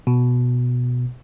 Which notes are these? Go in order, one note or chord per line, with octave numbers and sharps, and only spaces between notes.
B2